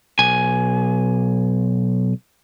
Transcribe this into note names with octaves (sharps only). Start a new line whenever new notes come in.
B1 G#5